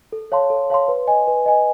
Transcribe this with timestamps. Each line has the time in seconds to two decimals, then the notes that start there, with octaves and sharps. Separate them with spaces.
0.12 A4
0.32 C#5 F5 A5 C6
0.50 A4
0.70 C#5 F5 A5 C6
0.88 B4
1.07 D#5 G#5
1.28 B4
1.46 D#5 G#5